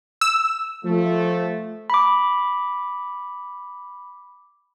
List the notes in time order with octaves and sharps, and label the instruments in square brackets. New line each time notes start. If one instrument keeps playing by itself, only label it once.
[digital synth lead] E6
[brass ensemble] F3 A3
[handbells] B5 D6